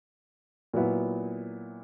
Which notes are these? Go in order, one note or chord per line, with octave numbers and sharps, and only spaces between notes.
A#2 F#3 B3 E4